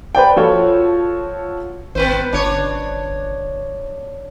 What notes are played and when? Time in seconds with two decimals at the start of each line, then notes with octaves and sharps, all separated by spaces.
0.15 B4 C5 D5 G5
0.36 F3 F4 F#4 A4 C#5
1.95 G#1 B3 B4 C5
2.33 G1 D4 C#5